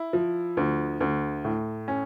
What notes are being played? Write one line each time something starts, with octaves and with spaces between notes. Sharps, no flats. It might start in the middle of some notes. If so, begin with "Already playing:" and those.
Already playing: E4
F3
D2
D2
A2
C#4